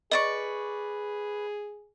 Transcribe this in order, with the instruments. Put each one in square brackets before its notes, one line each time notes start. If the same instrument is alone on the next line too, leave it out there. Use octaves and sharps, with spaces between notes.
[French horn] G#4 [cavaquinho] B4 D5 C#6 [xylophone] D#5